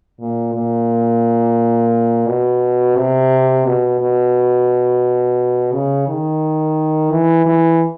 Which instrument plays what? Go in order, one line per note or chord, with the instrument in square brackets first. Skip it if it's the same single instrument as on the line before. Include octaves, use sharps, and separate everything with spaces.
[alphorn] A#2
A#2
B2
C3
B2
B2
C#3
D#3
E3
E3